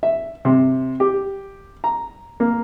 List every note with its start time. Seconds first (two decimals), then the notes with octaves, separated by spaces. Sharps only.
0.03 E5
0.45 C3
1.00 G4
1.84 A#5
2.40 A#3